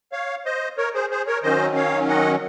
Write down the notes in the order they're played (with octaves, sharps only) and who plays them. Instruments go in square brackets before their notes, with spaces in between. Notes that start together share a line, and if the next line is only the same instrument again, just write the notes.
[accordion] C#5 F5
C5 D#5
A#4 C#5
G#4 C5
G#4 C5
A#4 C#5
D#3 F#3 C#4 C5 D#5
C#5 F5
D#5 F#5